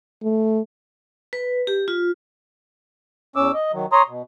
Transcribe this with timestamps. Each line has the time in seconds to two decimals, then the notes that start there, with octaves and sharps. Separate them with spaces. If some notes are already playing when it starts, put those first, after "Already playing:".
0.23 A3
1.33 B4
1.67 G4
1.88 F4
3.36 E2 C#4 D6 E6
3.54 D#5
3.73 D#3 F#3
3.92 C#5 A#5 C6 D#6
4.08 B2